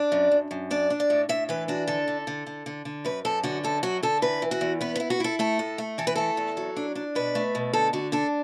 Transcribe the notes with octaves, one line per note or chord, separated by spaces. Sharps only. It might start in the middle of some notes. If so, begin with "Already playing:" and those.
Already playing: D4 D5
F#2
F#2
F#2
D4 D5
D4
D5
A2
A2 E5
E3 B4
D4 F#4
D3 A4
D3
D3
D3
D3
D3
F#2 B4
F#2 A4
D3 F#4
F#2 A4
F#3 F#4
D3 A4
E3 B4
E3
F#4
E2
B3 B4
B4
E4
F#4
E4 A4
A3 A4
A2
A3
E3 A4
B4
A3 A4
E2
F#3
D4
D4
B2 B4
A3
B2
D3 A4
D3 F#4
D4 A4